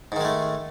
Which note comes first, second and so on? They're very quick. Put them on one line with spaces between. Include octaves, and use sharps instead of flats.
G#2 D#3 G#3 A3